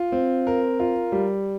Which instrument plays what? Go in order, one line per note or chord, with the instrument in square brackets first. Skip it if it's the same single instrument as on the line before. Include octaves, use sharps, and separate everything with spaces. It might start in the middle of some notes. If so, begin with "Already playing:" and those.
Already playing: [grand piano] F4
C4
A#4
F4
G3